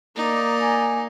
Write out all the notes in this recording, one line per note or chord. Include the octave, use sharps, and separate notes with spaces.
A#3 D#4 D5
G#5